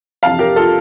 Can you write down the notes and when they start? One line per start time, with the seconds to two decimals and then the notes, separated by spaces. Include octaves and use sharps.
0.23 F2 C3 E3 F5 A5
0.39 G4 A#4
0.56 F4 A4